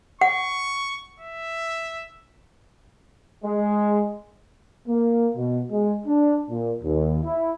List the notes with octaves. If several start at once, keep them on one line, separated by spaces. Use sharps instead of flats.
F#5 C#6
E5
G#3
A#3
B2
G#3
D4
A#2
D#2
E4